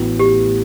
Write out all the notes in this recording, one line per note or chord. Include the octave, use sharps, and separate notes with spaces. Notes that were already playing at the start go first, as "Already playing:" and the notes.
Already playing: A1 A2 E3 B3 F#4
G4